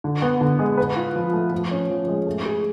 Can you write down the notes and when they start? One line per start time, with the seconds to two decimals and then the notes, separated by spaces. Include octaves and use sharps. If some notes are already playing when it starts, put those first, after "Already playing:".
0.04 D3
0.22 B3
0.41 D3
0.59 G#3
0.78 B4
0.96 F4
1.16 F3
1.33 A3
1.52 F3
1.71 C#4
1.90 F3
2.08 G#3
2.26 A3
2.46 G#4